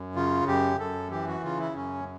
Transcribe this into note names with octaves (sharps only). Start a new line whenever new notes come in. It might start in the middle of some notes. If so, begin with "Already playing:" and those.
Already playing: F#2
C#3 F4
F#2 G4
F#2 A4
E3 G4
F#4
C#3 F4
E4
F#2 C#4